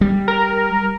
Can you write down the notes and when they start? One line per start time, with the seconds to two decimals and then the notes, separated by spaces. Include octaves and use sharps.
0.01 G3
0.28 A#4